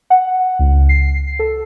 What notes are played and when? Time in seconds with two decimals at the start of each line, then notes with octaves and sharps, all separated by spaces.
0.10 F#5
0.59 C#2
0.89 C7
1.39 A4